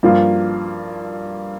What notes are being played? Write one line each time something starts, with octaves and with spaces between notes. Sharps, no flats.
G2 F3 A#3 F4